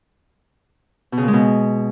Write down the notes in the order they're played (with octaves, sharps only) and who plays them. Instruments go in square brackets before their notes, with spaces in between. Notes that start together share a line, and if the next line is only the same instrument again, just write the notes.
[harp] B2
C#3
A#2
G#3
B2